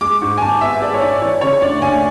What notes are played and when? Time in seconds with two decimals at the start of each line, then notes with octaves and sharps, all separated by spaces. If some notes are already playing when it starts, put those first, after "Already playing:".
0.01 G#3 D6
0.21 G#2 C#6
0.38 G#5
0.42 G#1 A5
0.61 B3 E5
0.82 G#3 D5
0.94 C#5
1.01 G#2 D5
1.21 E3 C#5
1.41 C#3 C#5
1.62 D2 D5
1.82 D2 G#5